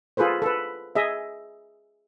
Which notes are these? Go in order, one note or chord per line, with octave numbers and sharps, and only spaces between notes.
F4 G#4 A4 B4 C5
A4 B4
G#4 D#5 E5